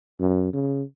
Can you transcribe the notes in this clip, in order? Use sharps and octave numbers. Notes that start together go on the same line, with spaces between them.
F#2
C#3